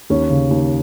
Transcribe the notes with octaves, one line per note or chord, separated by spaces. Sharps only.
D#2 C#4
C#3
D#2